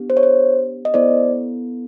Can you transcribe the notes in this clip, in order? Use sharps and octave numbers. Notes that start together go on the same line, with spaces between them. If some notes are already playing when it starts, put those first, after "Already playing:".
Already playing: B3 D4 G4
C5
C#5
C5
D#5
B3 E4 A4 C5 D5